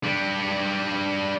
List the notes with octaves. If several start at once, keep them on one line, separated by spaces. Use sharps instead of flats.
G3 D4